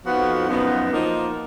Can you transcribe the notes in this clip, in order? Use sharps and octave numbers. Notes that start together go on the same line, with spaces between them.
F2 F3 B3 D#4 F#4
F#2 F3 B3 D#4
F3 A#3 D#4